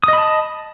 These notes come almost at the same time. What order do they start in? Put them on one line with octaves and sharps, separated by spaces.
D#6 D#5 B5 A5